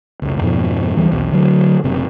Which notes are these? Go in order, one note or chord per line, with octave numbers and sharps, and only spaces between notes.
F1 C#2
F2 G#2 B2 F3
D#2 E3 G3
B1 E2
D3 F#3
F#1 C3